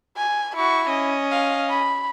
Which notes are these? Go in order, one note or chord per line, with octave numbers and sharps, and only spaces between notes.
G#5
E4 F#4 C#6
C#4 D#5
F5
B5